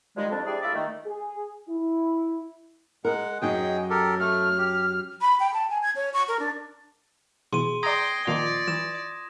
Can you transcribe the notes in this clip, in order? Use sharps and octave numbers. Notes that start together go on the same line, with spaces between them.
D#3 F3 G3 G#3
F2 D4
D4 E4 G4 G#4 D5
A3 E4 F4 D5 E5
D#3 A3
G#4
E4
G#3 A#4 F#5
F#2 F#3 D#4 G#4 D#5 G5
G4 A4 A#4
A3 F6
G4
B5
G5
A5
G#5
G#6
C#5
C#6
A#4
D4
B2 E3 G#4 C6 D#7
D5 G5 A#5 C6 D#6 G#6 A#6
A#2 D#3 F3 F4 D5
E3 E7